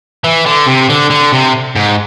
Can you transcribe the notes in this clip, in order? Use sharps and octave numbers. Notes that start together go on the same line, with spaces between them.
E3
D3
C3
D3
D3
C3
G#2